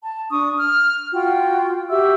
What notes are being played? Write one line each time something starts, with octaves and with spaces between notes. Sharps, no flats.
A5
D4 C#6 D#6
F6
F4 F#4 G5
F#4 G4 E5 E6